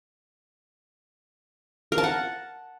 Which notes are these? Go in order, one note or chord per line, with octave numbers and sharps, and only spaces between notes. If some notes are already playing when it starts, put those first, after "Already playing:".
A#4
A5
F#5